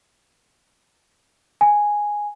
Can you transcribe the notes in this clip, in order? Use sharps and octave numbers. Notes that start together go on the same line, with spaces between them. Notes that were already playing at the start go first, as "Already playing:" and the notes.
G#5